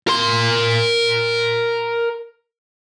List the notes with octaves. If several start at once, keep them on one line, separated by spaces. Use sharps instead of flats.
A#4 C6